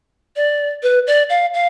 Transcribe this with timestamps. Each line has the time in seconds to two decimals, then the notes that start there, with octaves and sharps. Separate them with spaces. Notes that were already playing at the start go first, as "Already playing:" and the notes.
0.36 D5
0.83 B4
1.07 D5
1.30 F5
1.54 F5